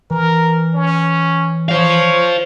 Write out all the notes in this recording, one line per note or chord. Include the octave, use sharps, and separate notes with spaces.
E3 A#4
C#4
C5 C#5 F5